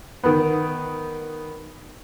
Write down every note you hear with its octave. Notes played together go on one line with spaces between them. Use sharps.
D#3 B3